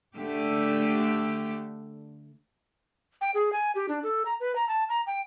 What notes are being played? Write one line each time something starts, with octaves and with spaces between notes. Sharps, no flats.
D3 A3 G4
G5
G#4
G#5
G4
D4
A4
A#5
B4
A#5
A5
A#5
G5